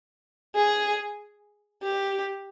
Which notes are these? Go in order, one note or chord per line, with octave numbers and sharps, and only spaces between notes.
G#4
G4